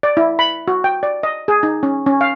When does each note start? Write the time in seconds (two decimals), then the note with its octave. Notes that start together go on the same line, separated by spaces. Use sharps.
0.03 D5
0.17 E4
0.39 B5
0.68 F#4
0.84 G5
1.03 D5
1.23 D#5
1.48 G#4
1.63 D#4
1.83 C#4
2.06 C#4
2.21 F5